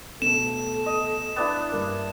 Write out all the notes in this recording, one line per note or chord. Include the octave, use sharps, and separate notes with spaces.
B2 A3 A4 E7
D#5
B3 D4 E4
G2 A#3